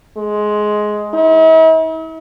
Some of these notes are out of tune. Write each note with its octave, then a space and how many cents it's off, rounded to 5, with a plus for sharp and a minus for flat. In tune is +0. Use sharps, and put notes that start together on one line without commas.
G#3 +15
E4 -45